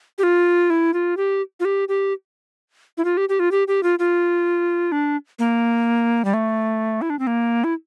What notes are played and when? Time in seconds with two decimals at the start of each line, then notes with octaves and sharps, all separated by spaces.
0.18 G4
0.23 F4
0.70 E4
0.94 F4
1.17 G4
1.60 F4
1.65 G4
1.89 G4
2.98 E4
3.05 F4
3.17 G4
3.29 G4
3.40 F4
3.51 G4
3.68 G4
3.83 F4
3.99 F4
4.92 D4
5.39 A#3
6.25 G3
6.34 A3
7.02 E4
7.10 D4
7.19 C4
7.27 A#3
7.64 E4